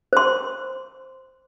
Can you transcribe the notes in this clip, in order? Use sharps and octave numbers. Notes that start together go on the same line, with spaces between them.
C5 C6